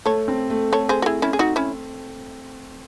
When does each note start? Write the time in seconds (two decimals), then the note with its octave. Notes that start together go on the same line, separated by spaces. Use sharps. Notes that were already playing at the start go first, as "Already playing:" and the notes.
0.06 A3 A4 C#5
0.28 C4
0.50 A3
0.73 A4 C#5
0.89 G#4 C5
1.02 F#4
1.06 E4 G#4
1.22 C#4 E4
1.33 G#4
1.39 D#4 F#4
1.56 C#4 E4